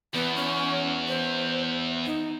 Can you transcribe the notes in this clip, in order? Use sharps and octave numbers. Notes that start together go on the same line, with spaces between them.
E2 B3
C#4
C5
D#4